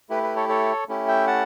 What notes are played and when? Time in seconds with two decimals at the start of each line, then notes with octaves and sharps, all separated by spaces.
0.10 A3 E4 G4 B4
0.23 B4
0.36 A4 C#5
0.49 A4 C#5
0.88 A3 C#4 E4 G4
1.08 E5 G5
1.27 F#5 A5